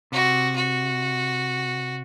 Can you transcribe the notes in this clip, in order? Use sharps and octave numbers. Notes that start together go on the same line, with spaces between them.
C3 F#4
F#4